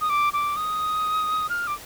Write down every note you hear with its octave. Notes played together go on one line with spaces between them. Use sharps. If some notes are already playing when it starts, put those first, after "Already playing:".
D#6
D6
D6
D#6
F6
D6